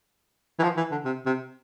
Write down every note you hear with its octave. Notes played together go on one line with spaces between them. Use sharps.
E3
F3
E3
D3
C3
C3